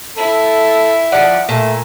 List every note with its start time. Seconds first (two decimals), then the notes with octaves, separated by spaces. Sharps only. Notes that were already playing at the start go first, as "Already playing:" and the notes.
0.17 E4 A4
1.12 F3 D5 F#5
1.49 A#2 A3